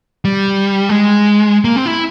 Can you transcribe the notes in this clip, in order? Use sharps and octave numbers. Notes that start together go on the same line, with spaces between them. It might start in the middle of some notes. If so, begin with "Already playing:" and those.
G3
G#3
A#3
C4
E4